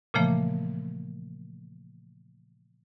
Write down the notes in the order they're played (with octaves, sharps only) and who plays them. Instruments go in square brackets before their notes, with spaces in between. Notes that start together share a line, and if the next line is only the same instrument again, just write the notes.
[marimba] A#2 C#3 E3 F3 A3 A#3